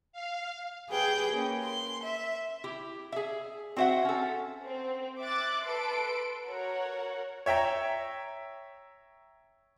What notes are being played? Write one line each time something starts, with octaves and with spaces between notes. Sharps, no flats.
F5
G4 G#4 B4 G5
A#3 C#4
C6
E5
E4 G4
G#4 E5
C4 F#4 C5 E5 F#5
C#4 A4
C4
E5 D6 F#6 A6
A4 B4 C6 D7
F#4 A#4 C#5 F#5
C#5 E5 G5 A#5